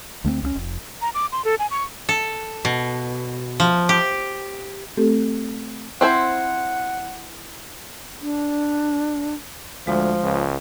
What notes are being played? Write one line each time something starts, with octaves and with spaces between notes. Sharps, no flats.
D2 A3 A#3 C4
C#2 A3 C#4
F1
A#5
D6
C6
A4
G#5
C#6
A4
B2
F3
G4
A3 C4 G4 A4
C4 E4 C5 F#5
D4
D2 F3 G#3
C#2